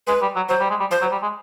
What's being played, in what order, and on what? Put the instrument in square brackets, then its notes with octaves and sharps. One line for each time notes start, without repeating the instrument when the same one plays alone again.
[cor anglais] G#3 [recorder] B4
[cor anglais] G3
F#3
[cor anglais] F#3 [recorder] C5
[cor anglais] G3
G#3
G3
[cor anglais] F3 [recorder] C5
[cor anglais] F#3
G3
G#3